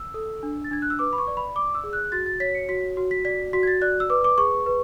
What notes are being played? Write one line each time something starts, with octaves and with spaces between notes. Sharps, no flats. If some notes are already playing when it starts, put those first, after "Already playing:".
Already playing: E6
A4
D4
A6
D4 G#6
F#6
E6
B4 D6
B5
C#6
D5
B5
D5 D6
E6
G#4
F#6
F#4 A6
A6
C#5 B6
C#7
F#4 B6
F#4
B6
D5 B6
F#4 B6
G#6
A6
D5 F#6
E6
B4 D6
D6
G#4 C#6
B4